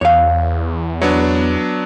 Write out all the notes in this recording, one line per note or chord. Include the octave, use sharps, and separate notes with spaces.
E2 C#5 F5
F#3 B3 D4 C#5